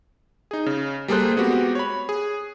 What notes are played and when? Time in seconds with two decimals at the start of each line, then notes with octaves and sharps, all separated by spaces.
0.51 D#4 G#4
0.66 C#3
1.08 G3 A#3 G#4 A4 C5 F#6
1.36 G#3 B3 C4 F#4 G4
1.75 C#5 B5
2.09 G#4